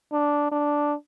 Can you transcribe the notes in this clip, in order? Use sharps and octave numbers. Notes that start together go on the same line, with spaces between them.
D4
D4